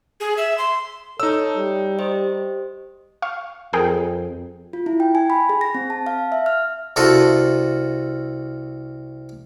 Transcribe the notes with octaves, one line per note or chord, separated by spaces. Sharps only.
G#4
E5
C6
D#4 A4 C#5 E6
G3
G4 C5 D#5
F5 C#6
F2 G#4 A#4 G5
F4
E4
G5
G#5
B5
G#4
A#6
C4
A5
F5
E5
F6
C2 F4 F#4 A4 E5